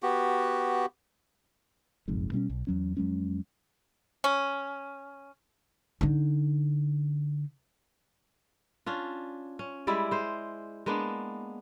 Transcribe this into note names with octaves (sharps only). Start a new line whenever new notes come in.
B3 F#4 G4
F#1 B1 F2 G#2
B2 G3 C4 C#4
B1
E2 F#3 C#4
F2 F#3 G#3 C#4
C#4
D3 D#4
C#4 D4 F4
C#4
G3 G#3 E4 D5
G#3 C5
G#3 A#3 B3 D4